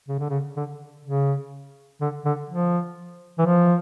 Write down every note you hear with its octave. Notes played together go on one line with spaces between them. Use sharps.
C#3
D3
C#3
D3
C#3
D3
D3
F3
E3
F3